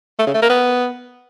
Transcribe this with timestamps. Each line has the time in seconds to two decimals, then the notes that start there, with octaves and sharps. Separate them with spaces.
0.19 A3
0.27 C#3
0.34 A3
0.42 A#3
0.50 B3